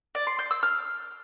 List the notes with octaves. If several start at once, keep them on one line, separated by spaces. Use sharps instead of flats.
D5
C6
G6
E6
F6